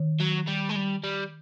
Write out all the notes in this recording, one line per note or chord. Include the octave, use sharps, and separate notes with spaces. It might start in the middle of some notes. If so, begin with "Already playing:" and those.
Already playing: D#3
F#3
G3
G#3
G3
G3